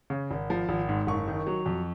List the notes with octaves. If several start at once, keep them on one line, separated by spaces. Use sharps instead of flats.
C#3
G#1
F3
G#1
G#2
F#1 C#6
D#3
F#3
F2